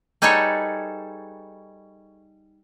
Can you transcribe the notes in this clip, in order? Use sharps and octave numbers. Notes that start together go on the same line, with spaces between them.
G3 D#4 G#4 A4 B4 C#5